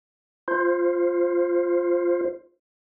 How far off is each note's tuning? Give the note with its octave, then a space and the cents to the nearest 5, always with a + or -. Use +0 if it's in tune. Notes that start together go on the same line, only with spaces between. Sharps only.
F4 +0 C5 +0